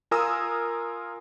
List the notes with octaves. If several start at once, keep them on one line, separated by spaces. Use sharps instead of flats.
F4 A#4 G#5 A#5 D#6 E6